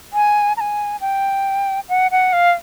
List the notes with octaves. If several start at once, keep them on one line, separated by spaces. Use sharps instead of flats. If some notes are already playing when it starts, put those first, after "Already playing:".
G#5
A#5
G#5
G5
F#5
F#5
F5